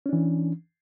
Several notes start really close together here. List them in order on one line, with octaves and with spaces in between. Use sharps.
C#4 D4 E3